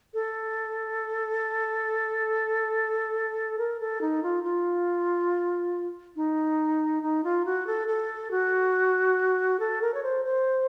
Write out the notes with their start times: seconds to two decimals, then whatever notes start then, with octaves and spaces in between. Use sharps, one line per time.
0.14 A4
3.59 A#4
3.80 A4
4.01 D#4
4.23 F4
4.44 F4
6.16 D#4
7.03 D#4
7.24 F4
7.45 F#4
7.67 A4
7.88 A4
8.31 F#4
9.60 A4
9.82 A#4
9.94 C#5
10.03 C5
10.25 C5